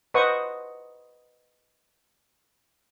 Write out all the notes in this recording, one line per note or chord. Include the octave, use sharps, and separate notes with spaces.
B4 C5 D#5 F#5 C#6 D#6